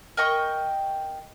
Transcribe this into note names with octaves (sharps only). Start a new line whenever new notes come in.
A#4 D#5 G5 C#6